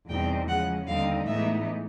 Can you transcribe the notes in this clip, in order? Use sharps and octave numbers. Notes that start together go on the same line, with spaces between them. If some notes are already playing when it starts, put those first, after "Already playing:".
E2 B2 G3 C4 D#4 G5
C#3 F3 G#3 C#4 F#5
D#2 D3 G3 C4 D#4 F5
A2 E3 G#3 B3 D#4 E5